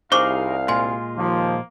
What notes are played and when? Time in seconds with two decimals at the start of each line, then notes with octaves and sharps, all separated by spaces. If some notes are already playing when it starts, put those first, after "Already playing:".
0.12 C2 D#4 G#4 A#4 C5 F5 C#6 D6
0.68 A#2 G#3 F4 G#5 C6
1.17 D#2 F3 A#3